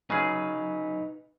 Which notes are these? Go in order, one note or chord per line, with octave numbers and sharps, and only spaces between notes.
C#3 F#3 D#4 G#4 B4